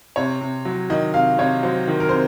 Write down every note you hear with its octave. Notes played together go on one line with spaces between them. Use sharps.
C3 C#5
C3
F#3
D#3 D#5
C3 F5
C3 C#5
F#3 C5
D#3
A#4
C3 C5